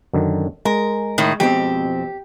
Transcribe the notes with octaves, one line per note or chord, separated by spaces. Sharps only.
F#2 D3 D#3
G#3 A#4
A2 D#3
F2 B2 C4 G4